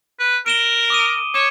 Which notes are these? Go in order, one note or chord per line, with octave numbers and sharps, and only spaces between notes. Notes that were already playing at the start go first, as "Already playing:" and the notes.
B4
A#4 D7 E7 G7
D6 D#6 D#7
C#5 D6 E7